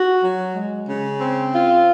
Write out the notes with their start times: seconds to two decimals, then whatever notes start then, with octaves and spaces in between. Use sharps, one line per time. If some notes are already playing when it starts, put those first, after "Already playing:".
Already playing: F#4
0.20 F#3
0.54 G#3
0.87 C#3
1.20 C4
1.53 F4